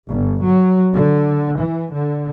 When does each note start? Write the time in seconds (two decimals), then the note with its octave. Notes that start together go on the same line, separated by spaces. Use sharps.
0.10 G1
0.42 F#3
0.93 D3
1.58 E3
1.93 D3